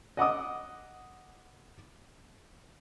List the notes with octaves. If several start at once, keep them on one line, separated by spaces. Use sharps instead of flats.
D#5 F#5 D6 D#6